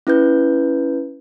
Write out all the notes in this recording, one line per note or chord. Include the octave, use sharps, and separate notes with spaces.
C#4 E4 B4 G6